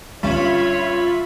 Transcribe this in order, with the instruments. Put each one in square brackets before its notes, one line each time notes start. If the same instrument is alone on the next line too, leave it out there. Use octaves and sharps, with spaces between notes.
[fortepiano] G2 [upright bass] D3 C#4 [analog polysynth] F4 E5 B5 [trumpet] C#5